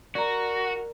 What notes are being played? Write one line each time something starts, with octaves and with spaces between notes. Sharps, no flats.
F#4 A#4 D5 A#5